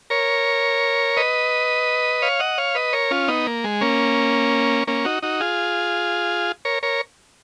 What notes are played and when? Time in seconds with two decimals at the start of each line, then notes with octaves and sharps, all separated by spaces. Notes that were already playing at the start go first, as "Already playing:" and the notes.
0.10 A#4 C#5
1.17 B4 D#5
2.22 C#5 F5
2.40 D#5 F#5
2.58 C#5 F5
2.75 B4 D#5
2.93 A#4 C#5
3.11 C#4 F4
3.28 B3 D#4
3.47 A#3
3.64 G#3
3.81 A#3 C#4
4.87 A#3 C#4
5.05 D#4 F#4
5.23 D#4 F#4
5.40 F4 G#4
6.65 A#4 C#5
6.83 A#4 C#5